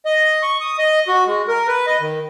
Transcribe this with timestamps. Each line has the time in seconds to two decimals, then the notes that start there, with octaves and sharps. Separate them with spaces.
0.06 D#5
0.43 C#6
0.60 D#6
0.79 D#5
1.08 F#4
1.27 G#3
1.48 A#4
1.68 B4
1.87 D#5
2.00 D#3